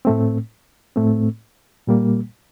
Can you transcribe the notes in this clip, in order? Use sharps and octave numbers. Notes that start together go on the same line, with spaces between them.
A2 A3 C4
A2 A3 C4
A#2 G3 A#3